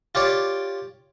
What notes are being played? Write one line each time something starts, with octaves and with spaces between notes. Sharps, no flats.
F4 G4 C#5 D5